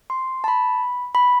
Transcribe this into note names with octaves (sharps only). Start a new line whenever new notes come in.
C6
A5
B5
B5